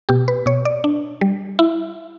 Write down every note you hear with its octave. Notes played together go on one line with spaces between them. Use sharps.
B2 G4
B4
B2 C#5
D5
D4
G3
E4